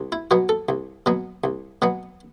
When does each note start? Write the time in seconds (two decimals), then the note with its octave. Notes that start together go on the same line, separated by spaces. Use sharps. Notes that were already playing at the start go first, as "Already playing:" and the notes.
Already playing: C2
0.12 E4
0.31 B2 F#3 B3 F#4
0.49 A4
0.69 C2
1.06 B2 F#3 B3
1.44 C2
1.82 B2 F#3 B3